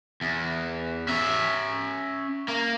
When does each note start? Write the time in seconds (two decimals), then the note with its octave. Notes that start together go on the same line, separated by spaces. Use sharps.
0.21 E2
1.08 C#4 E5
2.48 A#3